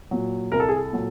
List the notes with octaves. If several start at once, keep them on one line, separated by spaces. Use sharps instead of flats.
A#2 F#3
C2 A#4
A4
G#4
A4
A#2 F#3